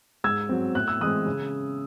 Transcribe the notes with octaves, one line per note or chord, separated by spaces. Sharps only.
G#2 E6 G#6
F#3 C4
A2 F#6
E6
E3 G#3 C4 D#6 F#6
C#3